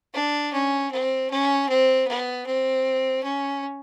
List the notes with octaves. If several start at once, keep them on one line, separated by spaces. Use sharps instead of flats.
D4
C#4
C4
C#4
C4
B3
C4
C#4